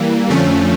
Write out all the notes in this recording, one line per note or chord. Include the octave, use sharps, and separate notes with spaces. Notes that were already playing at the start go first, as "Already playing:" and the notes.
Already playing: E3 G3 A#3
F2 D3 F3 A3 C#4